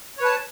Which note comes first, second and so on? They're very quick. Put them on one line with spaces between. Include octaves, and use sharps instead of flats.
C#5 B4 A5